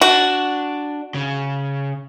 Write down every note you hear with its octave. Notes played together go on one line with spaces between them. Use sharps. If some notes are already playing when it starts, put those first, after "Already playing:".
D4 F#4
C#3